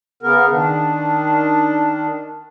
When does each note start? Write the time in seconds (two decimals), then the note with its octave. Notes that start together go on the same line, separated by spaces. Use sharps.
0.23 C#3 B3 A#4
0.52 D#3 D4